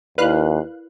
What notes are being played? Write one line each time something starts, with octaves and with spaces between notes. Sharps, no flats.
D#2 E4 A#4 B4 D5 F5 F#6